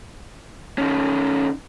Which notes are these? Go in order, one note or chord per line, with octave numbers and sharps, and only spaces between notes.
D#3 C#4